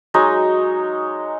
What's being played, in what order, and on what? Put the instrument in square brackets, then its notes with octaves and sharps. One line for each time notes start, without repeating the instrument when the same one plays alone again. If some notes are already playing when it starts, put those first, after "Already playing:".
[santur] F#3 G#3 D#4 C#5